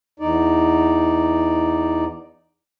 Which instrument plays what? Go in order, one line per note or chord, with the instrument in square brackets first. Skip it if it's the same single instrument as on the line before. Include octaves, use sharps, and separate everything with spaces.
[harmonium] E2 D#4 D5